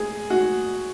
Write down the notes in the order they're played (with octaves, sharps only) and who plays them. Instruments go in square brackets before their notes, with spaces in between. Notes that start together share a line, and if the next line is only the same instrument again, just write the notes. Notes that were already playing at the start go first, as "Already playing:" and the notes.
Already playing: [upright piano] G#4
F#4